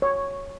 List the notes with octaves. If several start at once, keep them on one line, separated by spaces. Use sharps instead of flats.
C#5